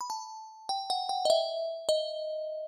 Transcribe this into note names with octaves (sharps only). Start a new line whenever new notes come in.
B5
A5
G5
F#5
G5
D#5
E5
D#5